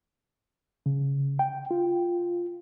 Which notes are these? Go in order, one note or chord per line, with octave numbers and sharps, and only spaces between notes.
C#3
G5
F4